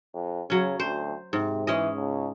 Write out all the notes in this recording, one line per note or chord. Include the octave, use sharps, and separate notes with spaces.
F2
C#3 F#3 C#4
D2 C5
G#2 C3
E3 G#3 C#4 D#5
C#2